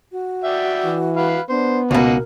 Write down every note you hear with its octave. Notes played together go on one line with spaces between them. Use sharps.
F#4
D5 E5 G5
E3
B4 F5
B3 D4 C5
C#2 B2 A#3 D#4 A#4 F#5